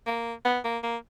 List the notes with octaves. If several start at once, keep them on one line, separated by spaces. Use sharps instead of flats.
A#3
B3
A#3
A#3